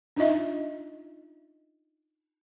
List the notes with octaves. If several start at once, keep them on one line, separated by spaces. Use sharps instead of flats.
D4 D#4 F4 D#5 E5